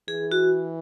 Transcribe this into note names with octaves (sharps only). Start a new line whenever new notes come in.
E3 G#4
F#4